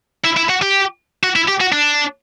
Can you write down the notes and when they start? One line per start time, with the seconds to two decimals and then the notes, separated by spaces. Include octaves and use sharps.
0.24 E4
0.37 E4
0.49 F#4
0.62 G4
1.23 F#4
1.36 E4
1.48 G4
1.61 F#4
1.72 D4